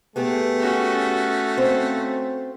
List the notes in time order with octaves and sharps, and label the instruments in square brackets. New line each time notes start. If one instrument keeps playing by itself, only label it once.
[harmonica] A3 [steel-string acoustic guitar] B3 G4 G#4
[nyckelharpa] C#4 F#4
[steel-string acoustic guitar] C4 C5 F5